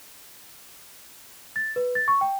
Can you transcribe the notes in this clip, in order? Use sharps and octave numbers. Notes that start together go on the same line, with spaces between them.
A6
B4
A6
C#6
G5